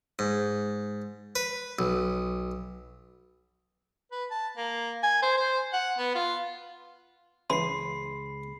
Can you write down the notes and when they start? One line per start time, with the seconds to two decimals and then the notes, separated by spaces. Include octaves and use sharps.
0.19 G#2
1.36 B4
1.79 B1
4.12 B4
4.31 A5
4.57 A#3
5.03 G#5
5.23 C5
5.37 C5
5.73 F#5
5.99 B3
6.15 F4
7.50 C#2 E3 C#4 G#4 B5 C6 C7